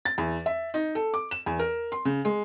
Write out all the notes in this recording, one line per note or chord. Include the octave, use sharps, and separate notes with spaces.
A6
E2
E5
D#4
A4
D6
E7
E2
A#4
C6
C#3
G#3